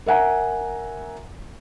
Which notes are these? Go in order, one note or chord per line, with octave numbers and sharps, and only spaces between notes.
A#4 E5 F#5 G#5 A#5